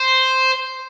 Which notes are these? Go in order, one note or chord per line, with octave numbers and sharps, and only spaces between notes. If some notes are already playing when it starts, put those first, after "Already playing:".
Already playing: C5